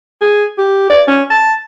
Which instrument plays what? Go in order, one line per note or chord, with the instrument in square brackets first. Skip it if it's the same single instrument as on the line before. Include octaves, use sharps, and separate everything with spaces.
[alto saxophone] G#4
G4
D5
C#4
A5